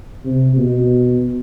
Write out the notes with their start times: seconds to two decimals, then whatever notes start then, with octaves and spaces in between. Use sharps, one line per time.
0.25 C3
0.57 B2